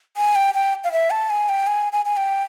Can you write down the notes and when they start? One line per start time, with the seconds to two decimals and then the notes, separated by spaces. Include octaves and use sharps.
0.17 G#5
0.35 G5
0.54 G5
0.84 F5
0.92 E5
1.10 A5
1.30 G#5
1.49 G5
1.67 G#5
1.92 G#5
2.05 G#5
2.17 G5